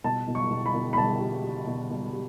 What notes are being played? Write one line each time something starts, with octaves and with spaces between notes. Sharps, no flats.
B2 A5
B2
C#6
B2
B5
B2
B5
B2 A5
G3
G3
B2
B2
G3